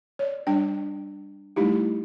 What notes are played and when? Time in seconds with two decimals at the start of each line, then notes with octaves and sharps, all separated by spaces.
0.19 C#5 D5
0.47 G3 D4 G5
1.56 G3 A3 D#4 E4 G4